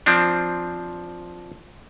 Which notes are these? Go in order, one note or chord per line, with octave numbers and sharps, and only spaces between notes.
F3 C4 D4